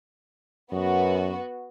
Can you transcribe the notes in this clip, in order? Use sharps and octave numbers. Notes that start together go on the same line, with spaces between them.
F#2 B3 F#4